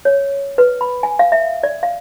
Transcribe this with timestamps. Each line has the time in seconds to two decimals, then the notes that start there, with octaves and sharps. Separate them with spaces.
0.05 C#5
0.58 B4
0.81 B5
1.03 G#5
1.19 F5
1.32 E5
1.63 D5
1.83 F5